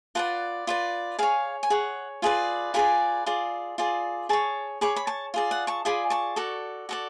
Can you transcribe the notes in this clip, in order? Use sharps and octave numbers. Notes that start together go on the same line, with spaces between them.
F4 B4 D5 F#5 A5
F4 B4 D5
G#4 C#5 F5 G#5
G#5
G#4 C#5 F#5
F4 G#4 B4 D5 F5 G#5
F4 G#4 B4 D5 G#5 B5
F4 G#4 D5
F4 G#4 D5
G#4 C#5 A5 C#6
G#4 C#5 B5 D6
B5
A5 C#6
F4 G#4 D5
F#5
A5 C#6
F4 G#4 D5 G#5 B5
A5 C#6
F#4 A4 D5
F#4 A4 D5